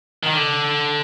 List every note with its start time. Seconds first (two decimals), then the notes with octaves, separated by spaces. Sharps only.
0.23 D#3
0.33 D3